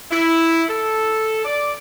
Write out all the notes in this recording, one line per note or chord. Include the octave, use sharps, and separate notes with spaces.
E4
A4
D5